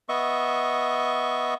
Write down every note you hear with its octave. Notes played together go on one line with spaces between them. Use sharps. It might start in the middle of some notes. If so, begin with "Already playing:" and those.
B3 D#5 E5 C#6